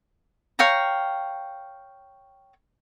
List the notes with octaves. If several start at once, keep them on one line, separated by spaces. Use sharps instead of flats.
C#5 F5 G5 A#5